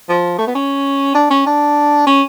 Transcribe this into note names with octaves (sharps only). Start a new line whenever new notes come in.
F3
A3
B3
C#4
D4
C#4
D4
C#4